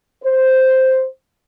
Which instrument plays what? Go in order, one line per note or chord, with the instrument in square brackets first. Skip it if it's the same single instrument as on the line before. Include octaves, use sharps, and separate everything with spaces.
[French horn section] C5